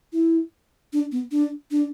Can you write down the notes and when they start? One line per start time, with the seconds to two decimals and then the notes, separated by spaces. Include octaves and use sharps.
0.13 E4
0.93 D4
1.12 B3
1.31 D4
1.71 D4